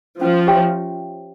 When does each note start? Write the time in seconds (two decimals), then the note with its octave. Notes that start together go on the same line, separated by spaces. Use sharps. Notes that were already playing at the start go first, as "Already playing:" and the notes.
0.21 F3 C#4
0.47 G4 C#5 E5 G5